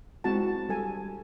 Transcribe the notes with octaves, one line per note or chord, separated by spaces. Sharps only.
G#3 C4 E4 F#4 F#5 A5
G3 A4 G#5